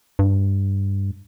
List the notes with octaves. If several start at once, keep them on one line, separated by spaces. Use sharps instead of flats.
G2